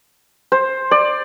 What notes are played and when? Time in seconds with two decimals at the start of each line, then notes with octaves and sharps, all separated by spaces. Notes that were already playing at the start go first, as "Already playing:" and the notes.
0.52 C5
0.91 D5